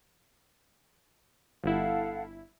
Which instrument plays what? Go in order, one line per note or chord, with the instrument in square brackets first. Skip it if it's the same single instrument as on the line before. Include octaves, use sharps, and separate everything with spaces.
[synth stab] G1 E4 [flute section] A4 F5 F#5